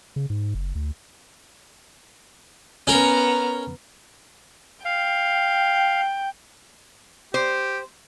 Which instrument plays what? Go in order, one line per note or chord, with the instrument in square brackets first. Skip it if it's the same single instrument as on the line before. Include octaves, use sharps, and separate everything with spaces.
[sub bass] C#3
G#2
F#1
D2
[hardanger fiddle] B3 A#5 [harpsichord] C#4 A#4
[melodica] F5 [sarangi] G5
[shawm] G4 [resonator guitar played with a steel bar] C5